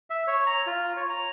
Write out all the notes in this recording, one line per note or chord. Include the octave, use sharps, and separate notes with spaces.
E5
C#5
A#5
F4
C#5
A#5